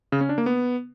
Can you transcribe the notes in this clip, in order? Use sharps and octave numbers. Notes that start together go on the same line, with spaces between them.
C#3
C#4
D4
A#3
B3